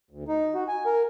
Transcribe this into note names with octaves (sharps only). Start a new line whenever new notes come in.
D2
D#4
F#4
G#5
A#4